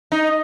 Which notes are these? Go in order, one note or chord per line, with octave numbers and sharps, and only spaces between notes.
D#4